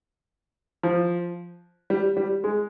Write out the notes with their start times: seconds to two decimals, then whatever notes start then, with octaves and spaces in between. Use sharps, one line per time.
0.83 F3
1.90 G3
2.17 G3
2.44 G#3